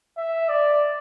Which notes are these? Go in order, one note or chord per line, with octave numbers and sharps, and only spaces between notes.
E5
D5